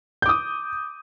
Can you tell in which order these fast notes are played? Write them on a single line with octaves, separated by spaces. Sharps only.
G6 D6 D#6